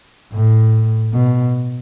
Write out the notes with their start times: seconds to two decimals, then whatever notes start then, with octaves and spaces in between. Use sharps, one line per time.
0.33 A2
1.13 B2